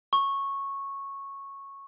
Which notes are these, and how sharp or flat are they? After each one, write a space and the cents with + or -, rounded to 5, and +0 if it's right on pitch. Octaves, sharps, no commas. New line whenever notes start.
C#6 -10